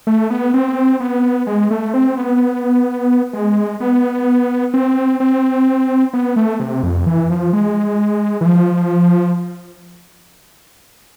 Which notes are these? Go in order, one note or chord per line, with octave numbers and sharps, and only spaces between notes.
A3
B3
C4
B3
G#3
A3
C4
B3
G#3
B3
C4
C4
B3
A3
C3
F2
E3
F3
G#3
E3
F3